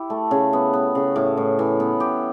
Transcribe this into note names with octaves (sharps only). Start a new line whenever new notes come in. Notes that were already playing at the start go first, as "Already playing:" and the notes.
Already playing: E4 G4
A3
C#3
B3
B3
C#3
A2
A2
E3
B3
G4